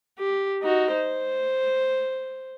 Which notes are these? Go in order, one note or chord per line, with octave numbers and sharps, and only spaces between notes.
G4
D#4 F#4
C5